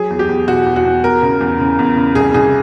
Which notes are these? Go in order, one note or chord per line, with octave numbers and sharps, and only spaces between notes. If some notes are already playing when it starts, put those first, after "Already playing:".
Already playing: F#3 G#4
E2
G4
E2
B2 F#4
E2
F#4
E2
E2 A#4
C#3
E2
C#3
E2
C#3
C2 G#4
C2 G#4